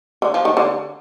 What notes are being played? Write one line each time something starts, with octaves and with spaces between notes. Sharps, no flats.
D3
F3
D#3
D3